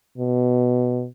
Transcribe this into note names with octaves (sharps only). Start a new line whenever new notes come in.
B2